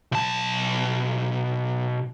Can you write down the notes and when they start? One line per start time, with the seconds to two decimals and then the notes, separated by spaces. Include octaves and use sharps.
0.12 B1 A5